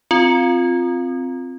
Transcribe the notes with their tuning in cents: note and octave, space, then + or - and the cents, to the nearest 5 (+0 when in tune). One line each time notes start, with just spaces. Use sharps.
C4 +0 F4 +0